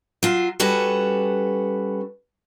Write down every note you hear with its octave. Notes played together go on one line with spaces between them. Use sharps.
F#3 F4
G3 C#4 F#4 A4 B4